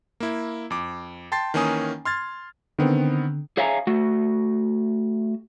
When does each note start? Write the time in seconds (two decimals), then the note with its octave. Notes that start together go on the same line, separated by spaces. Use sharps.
0.20 A#3 E4
0.70 F2 D6
1.32 G5 A5 C6 A6 C7
1.54 D#3 E3 A#3 C#4 G#5 D#6
2.05 C6 F6 G#6 A6
2.79 D3 D#3 B3 C4
3.57 G#4 C#5 E5 F5 G#5 A#5
3.87 A3 F#4